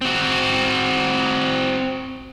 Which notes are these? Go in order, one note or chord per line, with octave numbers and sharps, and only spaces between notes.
C4 F#4